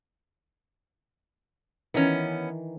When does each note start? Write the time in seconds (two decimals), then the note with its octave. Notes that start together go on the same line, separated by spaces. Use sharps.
1.94 D#3 E3 B3 C#4 A#5